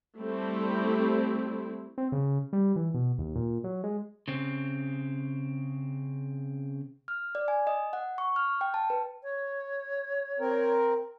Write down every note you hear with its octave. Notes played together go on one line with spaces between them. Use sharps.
G3 A3 C4 E4
C4
C#3
G3
E3
B2
D#2
A#2
F#3
G#3
C#3 C4
F6
D5
G#5
D#5
F#5
C#6
F6
G5
A5
B4
C#5
C4 A#4